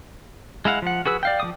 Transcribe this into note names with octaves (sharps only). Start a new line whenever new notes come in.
G#3 E4 F5 F#5
F3 F#5
F#4 G#4 B4 E6
D5 F5 G5
F3 A3 D6 D#6